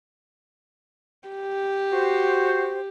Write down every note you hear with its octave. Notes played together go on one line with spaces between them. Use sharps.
G4
F#4 C5